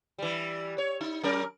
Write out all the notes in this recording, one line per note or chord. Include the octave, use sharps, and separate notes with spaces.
E3 G3
C#5
D#4
F#3 C#4 A#4